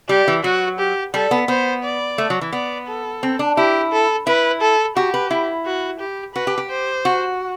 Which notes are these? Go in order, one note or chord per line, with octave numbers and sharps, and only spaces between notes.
G3 G4
E3
F#3 F#4
G4
G3 A4
B3
B3 C5
D5
A3
F#3
E3
B3 D5
A4
C4
D4
E4 G4
A4
E4 B4
A4
F#4 G4
B4
E4
F#4
G4
F#4 B4
G4
G4
C5
F#4